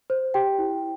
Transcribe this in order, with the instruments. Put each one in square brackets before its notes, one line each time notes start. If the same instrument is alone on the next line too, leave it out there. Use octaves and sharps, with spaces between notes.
[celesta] C5
G4 G5
E4